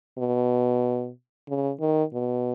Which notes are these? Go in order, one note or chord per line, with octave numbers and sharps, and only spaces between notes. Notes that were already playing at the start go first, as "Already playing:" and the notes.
B2
C#3
D#3
B2